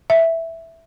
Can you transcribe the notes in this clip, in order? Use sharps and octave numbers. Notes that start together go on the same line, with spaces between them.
E5